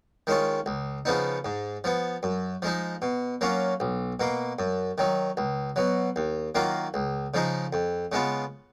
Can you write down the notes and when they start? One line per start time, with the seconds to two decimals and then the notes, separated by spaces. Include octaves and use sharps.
0.27 D#3 G#3 C#4 F4
0.66 C#2
1.05 C#3 F3 B3 D#4
1.45 G#2
1.84 F3 B3
2.23 F#2
2.62 F3 G#3 D#4
3.02 B2
3.41 F#3 A#3 C#4 F4
3.80 B1
4.20 B2 A#3
4.59 F#2
4.98 D#3 F#3
5.37 C#2
5.76 B2 F#3
6.16 D#2
6.55 D#3 F#3 A#3 F4
6.94 C#2
7.34 C#3 F3 G#3 D#4
7.73 F2
8.12 C#3 G#3 B3 F4